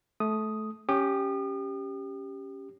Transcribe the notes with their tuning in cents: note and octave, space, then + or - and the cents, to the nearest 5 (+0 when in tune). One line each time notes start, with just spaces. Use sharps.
A3 -20 D#6 +0
C#4 +0 G4 +0 D#6 -45